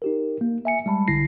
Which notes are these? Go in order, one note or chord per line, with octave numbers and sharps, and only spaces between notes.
D#4 G4 A#4
A#3
E5 G#5 C#7
G3 G#3 A5 B5
B1 D3 E4 A#6 C7